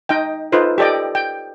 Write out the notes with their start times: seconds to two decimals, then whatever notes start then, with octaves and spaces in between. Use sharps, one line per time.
0.09 D#4 D#5 G5
0.52 D#4 F4 A4 B4 C5
0.78 G4 A4 D5 D#5 G5
1.15 G5